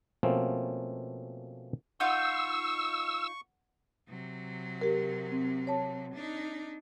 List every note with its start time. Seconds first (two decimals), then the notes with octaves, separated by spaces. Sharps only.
0.23 B2 F3 A3 A#3 C4 C#4
2.00 D#4 F4 F#5 C#6 E6
4.08 C3 F#3
4.81 G4 A#4
5.32 C4
5.67 C#5 A5
6.14 D4 D#4